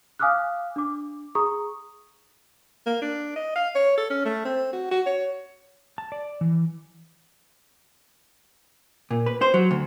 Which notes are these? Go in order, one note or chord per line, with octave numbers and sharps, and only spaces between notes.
F5 G#5 D6 D#6 F6 F#6
D4 D6
G#4 A#5 C#6 D#6
A#3
D4
D#5
F5
C#5
A4
C#4
A3
C4
F#4
F#4
C#5
A5
D5
E3
A#2
B4
C5
F#3
D2